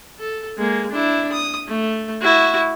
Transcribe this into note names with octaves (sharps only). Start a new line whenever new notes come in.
A4
G#3 A#3
D4 E4
D#6
A3
E4 F#4